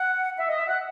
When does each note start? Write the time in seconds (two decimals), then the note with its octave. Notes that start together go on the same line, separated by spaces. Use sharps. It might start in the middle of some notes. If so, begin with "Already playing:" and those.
Already playing: F#5
0.39 E5
0.48 D#5
0.57 E5
0.67 F#5